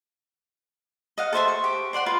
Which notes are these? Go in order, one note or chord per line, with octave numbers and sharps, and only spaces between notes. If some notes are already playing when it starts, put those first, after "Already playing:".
D#5 F5 F#5
A4 C5 E5 C6
C#6
G4
C5 D5 F#5 C6
F4 A#4 B4 F5